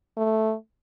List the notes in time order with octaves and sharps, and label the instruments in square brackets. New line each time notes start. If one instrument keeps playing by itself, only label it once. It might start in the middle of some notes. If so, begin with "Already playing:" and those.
[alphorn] A3